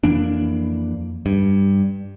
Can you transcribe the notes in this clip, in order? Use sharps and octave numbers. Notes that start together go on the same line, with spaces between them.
F2 E3 A#3 D4
G2